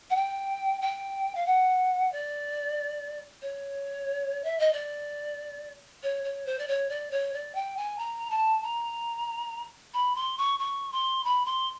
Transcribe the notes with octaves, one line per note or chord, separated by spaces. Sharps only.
F#5
G5
G5
F5
F#5
D5
C#5
E5
D#5
D5
C#5
C#5
C5
D5
C#5
D5
C#5
D5
G5
G#5
A#5
A5
A#5
B5
C6
C#6
C#6
C6
B5
C6